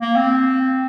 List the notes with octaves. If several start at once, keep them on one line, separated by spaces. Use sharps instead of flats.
A#3
C4